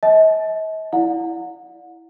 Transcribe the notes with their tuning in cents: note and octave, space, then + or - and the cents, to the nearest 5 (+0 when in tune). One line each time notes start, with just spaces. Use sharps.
D#5 +45 A5 -40
E4 +0 D5 -15 F#5 -35